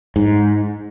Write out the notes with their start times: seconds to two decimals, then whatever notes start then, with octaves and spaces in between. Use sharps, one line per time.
0.16 G#2